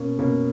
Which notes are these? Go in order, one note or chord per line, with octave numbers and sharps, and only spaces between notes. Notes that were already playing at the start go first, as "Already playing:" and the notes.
Already playing: B2 A#3 C#4
B2 A#3 C#4